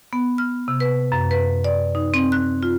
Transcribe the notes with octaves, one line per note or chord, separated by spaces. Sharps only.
B3
F6
C3
B4
F#2
B4
D5
D#4
C4
F#6
F4